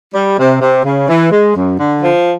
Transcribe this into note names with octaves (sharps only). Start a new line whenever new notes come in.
G3
C3
C3
C#3
E3
G#3
F#2
D3
F3